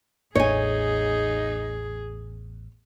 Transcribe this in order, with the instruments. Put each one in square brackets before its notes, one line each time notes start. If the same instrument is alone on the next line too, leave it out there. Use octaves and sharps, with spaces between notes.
[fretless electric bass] A1 E2 [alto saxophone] D#4 [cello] G#4 [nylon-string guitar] C#5 G#5